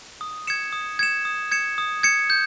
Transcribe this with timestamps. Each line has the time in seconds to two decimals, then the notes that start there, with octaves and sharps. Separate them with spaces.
0.21 D#6
0.47 G#6 C#7 E7
0.73 D#6
0.99 G#6 C#7 E7
1.25 D#6
1.52 G#6 C#7 E7
1.78 D#6
2.03 G#6 C#7 E7
2.30 G6